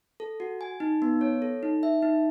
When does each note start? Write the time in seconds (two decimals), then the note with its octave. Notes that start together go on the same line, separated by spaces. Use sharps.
0.20 A4
0.40 F#4
0.61 G#5
0.80 D#4
1.02 B3
1.21 C#5
1.42 A4
1.63 D#4
1.83 E5
2.02 D#4